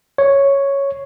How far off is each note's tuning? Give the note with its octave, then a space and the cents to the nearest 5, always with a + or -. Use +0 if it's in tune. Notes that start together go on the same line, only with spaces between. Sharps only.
C#5 +0